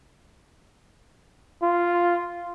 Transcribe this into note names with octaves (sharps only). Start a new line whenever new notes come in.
F4